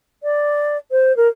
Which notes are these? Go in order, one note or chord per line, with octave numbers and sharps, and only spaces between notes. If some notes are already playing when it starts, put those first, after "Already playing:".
D5
C5
A#4